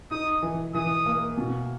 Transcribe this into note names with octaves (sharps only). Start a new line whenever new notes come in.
D#4 D#6
E3
E3 D#6
A#3
B2